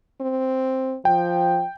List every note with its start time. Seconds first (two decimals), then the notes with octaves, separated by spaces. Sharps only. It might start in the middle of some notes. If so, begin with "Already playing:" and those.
0.21 C4
1.05 F3 G5